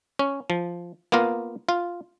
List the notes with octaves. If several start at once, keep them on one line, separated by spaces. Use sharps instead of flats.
C#4
F3
A#3 B3 F4 A#4
F4